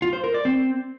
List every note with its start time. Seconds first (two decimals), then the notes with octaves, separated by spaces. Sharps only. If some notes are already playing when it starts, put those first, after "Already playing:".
0.02 F4
0.13 C5
0.24 A#4
0.34 D5
0.45 C4